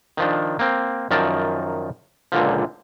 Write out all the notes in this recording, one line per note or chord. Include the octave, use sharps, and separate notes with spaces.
D#3 F3 D4
A#3 C4
F#2 D#3 F3 A#4 D5 A5
C#2 A#2 D3 F3